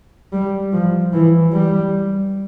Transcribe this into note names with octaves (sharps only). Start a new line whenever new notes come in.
G3
F3
E3
G3